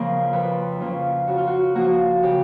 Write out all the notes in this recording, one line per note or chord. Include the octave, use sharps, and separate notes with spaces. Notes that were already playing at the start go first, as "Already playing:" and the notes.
Already playing: F2 C#3 F3 A#3 C#4 A#4
F2 B4
C#3 F3 A#3 C#4 F4
C#3 F#4
F4
F#4
F3 A#3 F#4
C#3 G4